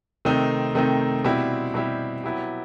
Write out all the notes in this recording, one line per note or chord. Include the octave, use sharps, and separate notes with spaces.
C3 D#3 A3 C4 D#4
C3 D#3 A3 C4 D#4
B2 G3 C4 E4 G4
B2 G3 C4 E4 G4
F#3 B3 E4 G4